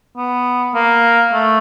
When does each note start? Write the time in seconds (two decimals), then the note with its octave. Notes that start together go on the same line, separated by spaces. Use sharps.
0.17 B3
0.74 A#3
1.33 A3